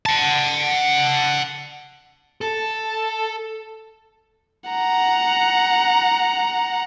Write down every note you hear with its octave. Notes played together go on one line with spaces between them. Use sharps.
F#5 A5
A4 A5
F#5 A#5